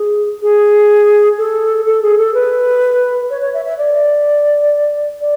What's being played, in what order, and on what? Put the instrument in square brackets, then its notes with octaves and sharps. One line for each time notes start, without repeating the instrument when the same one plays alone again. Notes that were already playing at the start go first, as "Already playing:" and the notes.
Already playing: [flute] G#4
G#4
A4
A4
G#4
A4
B4
C#5
C#5
E5
E5
D5
D5